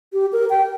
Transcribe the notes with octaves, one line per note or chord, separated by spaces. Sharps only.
G4
A#4
G5